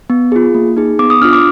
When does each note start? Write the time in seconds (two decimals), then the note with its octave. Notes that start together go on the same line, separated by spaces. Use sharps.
0.10 B3
0.32 F4 G#4
0.54 A#3
0.77 D#4 G#4
0.99 B3 D6
1.10 D#6
1.21 D4 F6
1.24 F4
1.33 D6